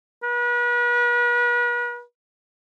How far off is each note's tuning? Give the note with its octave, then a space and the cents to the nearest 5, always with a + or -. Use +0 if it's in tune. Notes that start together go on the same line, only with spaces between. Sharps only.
B4 -40